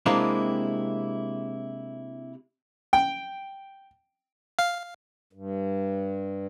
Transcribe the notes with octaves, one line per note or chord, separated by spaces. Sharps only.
C3 G#3 A#3 C4 D4 E4
G5
F5
G2